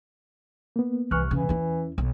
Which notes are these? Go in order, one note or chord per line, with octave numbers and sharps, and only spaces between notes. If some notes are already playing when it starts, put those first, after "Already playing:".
A#3 B3
C2 E3 C#6 F6 F#6
E2 C#3 E3
C#4 E4
B1